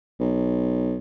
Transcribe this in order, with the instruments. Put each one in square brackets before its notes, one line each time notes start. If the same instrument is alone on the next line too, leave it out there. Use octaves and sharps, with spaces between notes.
[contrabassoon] B1